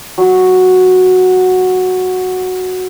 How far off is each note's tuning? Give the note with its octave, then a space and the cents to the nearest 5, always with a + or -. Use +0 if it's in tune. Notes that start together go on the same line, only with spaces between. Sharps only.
F#3 -5